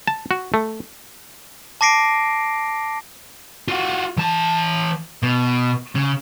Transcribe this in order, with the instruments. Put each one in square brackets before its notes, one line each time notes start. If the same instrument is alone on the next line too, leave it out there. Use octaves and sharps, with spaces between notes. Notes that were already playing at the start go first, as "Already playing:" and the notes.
[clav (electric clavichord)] A5
F#4
A3
[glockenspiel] A5 D6 A#6 C7 D7
[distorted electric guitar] F4 F#4
E3 A5
B2
C#3